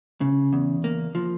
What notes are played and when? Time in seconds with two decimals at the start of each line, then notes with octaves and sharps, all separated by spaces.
0.21 C#3
0.53 E2
0.84 A#3
1.15 F3